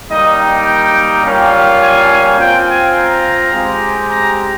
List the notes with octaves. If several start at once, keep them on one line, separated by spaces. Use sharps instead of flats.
G3 A#3 D#4 D#5
G5
G3 A#3 C#4 F4
G#5
G#5
C4 F4 G5
G#5
A#5
G#3 C4 G4
A#5